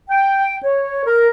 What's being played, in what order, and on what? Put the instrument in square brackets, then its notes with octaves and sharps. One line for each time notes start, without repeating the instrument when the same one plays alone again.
[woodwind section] G5
C#5
A#4